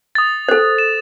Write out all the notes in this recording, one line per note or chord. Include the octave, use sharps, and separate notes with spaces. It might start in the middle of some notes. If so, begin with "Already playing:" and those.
D#6 A6
A4 C5
E7